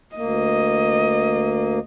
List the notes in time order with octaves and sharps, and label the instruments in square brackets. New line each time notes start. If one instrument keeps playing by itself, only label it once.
[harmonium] D2 A#3 [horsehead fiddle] D#5